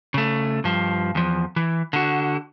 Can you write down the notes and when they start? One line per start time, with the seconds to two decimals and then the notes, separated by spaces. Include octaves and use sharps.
0.14 C#3 A3
0.64 G2 F3
1.15 E2 F3
1.56 E3
1.93 D3 F#4